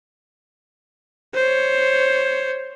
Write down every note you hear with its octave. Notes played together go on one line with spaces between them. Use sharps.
C5 C#5